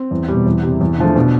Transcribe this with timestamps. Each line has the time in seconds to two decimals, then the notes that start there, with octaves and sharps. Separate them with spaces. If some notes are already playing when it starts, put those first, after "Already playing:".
Already playing: C4
0.11 E2
0.28 B2 G3
0.46 E2
0.63 C3 G3
0.81 E2
0.98 D3 F3 A3
1.16 B2 D4